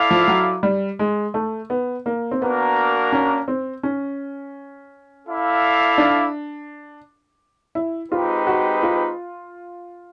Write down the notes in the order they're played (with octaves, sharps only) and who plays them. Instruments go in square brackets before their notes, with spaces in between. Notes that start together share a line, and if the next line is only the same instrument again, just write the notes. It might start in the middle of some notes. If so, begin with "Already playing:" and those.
Already playing: [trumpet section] E4 A4 D5 F5
[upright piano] F3
F#3
G3
G#3
A3
B3
A#3
C4
[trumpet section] A#3 D4 F#4 A#4 [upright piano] B3
[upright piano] C#4
C4
C#4
[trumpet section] E4 A4 D5 F5
[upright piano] D4
E4
[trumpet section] G#3 C4 D#4 G4 B4 [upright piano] F4
[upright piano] F#4
F4